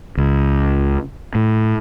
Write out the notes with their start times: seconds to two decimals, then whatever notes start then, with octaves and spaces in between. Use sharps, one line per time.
0.17 C#2
1.35 A2